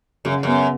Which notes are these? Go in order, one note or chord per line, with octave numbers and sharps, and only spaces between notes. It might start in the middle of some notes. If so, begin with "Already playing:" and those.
F#2 C#3
F#2 B3